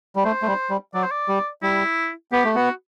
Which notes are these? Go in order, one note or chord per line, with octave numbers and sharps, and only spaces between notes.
G3
A3 C5
A3
G3
G3
F#3 D5
C5
D5
G3
G3 E4
B3 G4
A3
B3 F#4